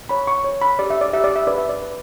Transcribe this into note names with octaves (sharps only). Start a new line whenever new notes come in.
C#5 B5
C#6
C#5
B5
G4 D5
E5
D5
G4 E5
D5
E5
B4 D5
E5
D5
B4